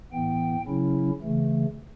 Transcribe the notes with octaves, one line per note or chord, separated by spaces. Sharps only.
A2 E3 B3 G5
C#3 F#3 C#4 E4
C#3 E3 A3